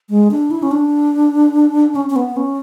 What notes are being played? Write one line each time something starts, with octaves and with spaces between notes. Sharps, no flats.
G#3
D4
E4
C#4
D4
C#4
C#4
B3
C#4